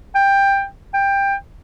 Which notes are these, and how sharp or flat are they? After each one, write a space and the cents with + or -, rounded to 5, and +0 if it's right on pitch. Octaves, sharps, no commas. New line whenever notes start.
G5 +15
G5 +20